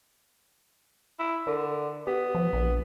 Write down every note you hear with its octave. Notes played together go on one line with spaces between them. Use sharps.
E4
D3 A#4
B3 G4
F3
A#1